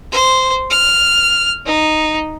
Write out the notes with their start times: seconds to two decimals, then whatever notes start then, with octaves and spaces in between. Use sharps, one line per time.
0.12 C5
0.71 F6
1.66 D#4